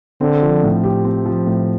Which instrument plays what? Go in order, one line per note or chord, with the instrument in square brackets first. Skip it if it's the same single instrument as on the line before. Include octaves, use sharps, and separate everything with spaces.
[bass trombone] D3 [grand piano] C4
[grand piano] F3
A2
G4
C4
F3
A2